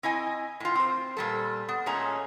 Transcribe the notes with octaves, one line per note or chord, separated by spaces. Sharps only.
C4 E4 D#5 G#5
A2 F4
C4 C5
A#2 G3 A4
B3
A#2 G#3 A3 C#4 A#5